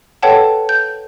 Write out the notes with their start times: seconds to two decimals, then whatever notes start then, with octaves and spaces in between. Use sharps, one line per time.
0.23 A4 B4 C#5 F#5 G5 A5
0.69 G6